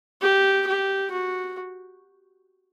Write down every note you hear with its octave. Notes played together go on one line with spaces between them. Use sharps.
G4
G4
F#4